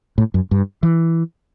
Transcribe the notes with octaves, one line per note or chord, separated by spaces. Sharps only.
A2
F#2
G2
E3